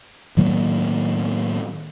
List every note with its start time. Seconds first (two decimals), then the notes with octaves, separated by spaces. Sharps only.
0.37 A2 D#3 F#3 A#3